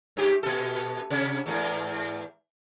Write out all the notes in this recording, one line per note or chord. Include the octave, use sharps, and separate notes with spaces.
G2 G4
A#2 A4
C3
E2 G#2